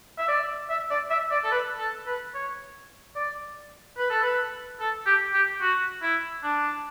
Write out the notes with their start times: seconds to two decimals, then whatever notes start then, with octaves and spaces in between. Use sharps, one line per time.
0.19 E5
0.28 D5
0.70 E5
0.91 D5
1.10 E5
1.31 D5
1.44 A4
1.52 B4
1.79 A4
2.06 B4
2.34 C#5
3.16 D5
3.97 B4
4.10 A4
4.23 B4
4.80 A4
5.06 G4
5.34 G4
5.61 F#4
6.03 E4
6.43 D4